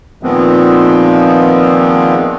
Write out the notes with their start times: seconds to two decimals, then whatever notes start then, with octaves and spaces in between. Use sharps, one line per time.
0.23 A#2 D#3 F3 G#3 B3 C4